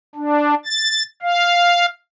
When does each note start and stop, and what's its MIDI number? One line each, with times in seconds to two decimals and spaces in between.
0.15 0.54 62
0.66 1.03 93
1.22 1.86 77